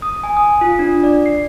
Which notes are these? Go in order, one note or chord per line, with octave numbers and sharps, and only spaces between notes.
D#6
G#5
D#6
F4
D4
D5
C7